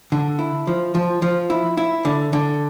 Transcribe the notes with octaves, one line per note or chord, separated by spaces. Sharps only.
D3
E4
F3
F3
F3
E4
E4
D3
D3